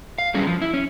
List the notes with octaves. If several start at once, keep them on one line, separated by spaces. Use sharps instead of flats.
F5
F#3 G3 C#4 G#4
F3
E4
C#4